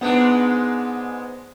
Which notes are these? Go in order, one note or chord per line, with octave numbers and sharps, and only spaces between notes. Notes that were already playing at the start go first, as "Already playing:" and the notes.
G#2 G#3 B3 D4